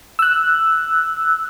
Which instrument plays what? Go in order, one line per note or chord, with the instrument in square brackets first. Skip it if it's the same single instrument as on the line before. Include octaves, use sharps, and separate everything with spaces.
[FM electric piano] E6 F#6